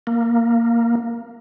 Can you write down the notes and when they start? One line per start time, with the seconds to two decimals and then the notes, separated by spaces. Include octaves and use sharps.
0.07 A#3